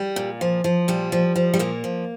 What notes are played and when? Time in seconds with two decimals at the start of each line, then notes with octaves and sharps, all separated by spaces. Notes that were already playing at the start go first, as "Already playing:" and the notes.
Already playing: G3
0.16 A#2
0.41 F3
0.64 F3
0.88 A#2 G3
1.12 F3
1.36 F3
1.54 G3
1.59 A#2 A#3
1.84 F3